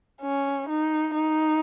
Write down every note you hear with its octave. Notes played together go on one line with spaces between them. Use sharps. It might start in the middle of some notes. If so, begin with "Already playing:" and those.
C#4
D#4
D#4